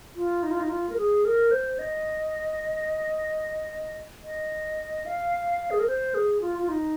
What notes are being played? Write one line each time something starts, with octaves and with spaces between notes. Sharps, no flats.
F4
D#4
F4
D#4
F4
A#4
G#4
A#4
C5
D#5
D#5
F5
G#4
A#4
C5
G#4
F4
F4
D#4